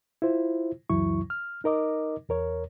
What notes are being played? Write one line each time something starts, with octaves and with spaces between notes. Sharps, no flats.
E4 F4 C5
C#2 F#2 E3 F#3 E4 C#6
F6
D#4 A#4 D#5 D6
E2 A#4 C#5